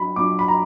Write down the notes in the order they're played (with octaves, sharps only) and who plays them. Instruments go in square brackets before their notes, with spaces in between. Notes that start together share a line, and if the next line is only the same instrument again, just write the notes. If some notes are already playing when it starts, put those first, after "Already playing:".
Already playing: [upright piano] F#3 D4 B5
A#2 F#3 D4 D6
B5
A#5